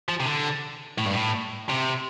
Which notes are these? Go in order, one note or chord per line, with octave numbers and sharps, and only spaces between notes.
F3
C3
D3
A2
G2
A2
C3